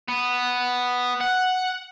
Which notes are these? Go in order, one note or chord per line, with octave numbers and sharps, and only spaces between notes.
B3
F#5